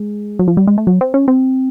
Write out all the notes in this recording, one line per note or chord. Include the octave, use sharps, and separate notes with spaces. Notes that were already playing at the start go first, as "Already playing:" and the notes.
Already playing: G#3
F#3
F3
G3
G#3
A3
F#3
C4
C#4
C4